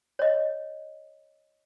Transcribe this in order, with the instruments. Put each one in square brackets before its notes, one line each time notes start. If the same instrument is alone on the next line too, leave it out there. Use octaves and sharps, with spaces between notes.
[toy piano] C#5 D#5